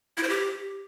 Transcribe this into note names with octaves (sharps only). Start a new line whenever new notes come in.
E4
C5
G4